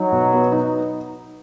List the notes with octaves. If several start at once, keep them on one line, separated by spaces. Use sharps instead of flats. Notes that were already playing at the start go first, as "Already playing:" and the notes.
Already playing: F#3 D#4
B2
B3
D#4